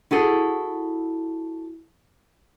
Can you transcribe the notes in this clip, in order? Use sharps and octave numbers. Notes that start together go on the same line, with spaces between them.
E4 F#4 G#4 A4